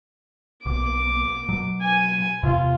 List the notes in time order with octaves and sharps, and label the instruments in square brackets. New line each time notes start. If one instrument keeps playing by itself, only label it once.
[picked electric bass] B1 [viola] D6
[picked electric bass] B2 F#3
[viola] G#5
[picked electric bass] E2 C3 [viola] F4